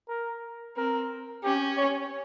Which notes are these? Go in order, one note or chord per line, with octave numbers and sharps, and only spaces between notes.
A#4
C4 A#4
C#4 G4
C#5